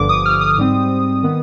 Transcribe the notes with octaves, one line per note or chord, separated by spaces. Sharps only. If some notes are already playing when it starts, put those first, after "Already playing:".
Already playing: G1 G2 D3 F3 D6
D#6
F6
D#6
G#2 G3 C4
D#3 B3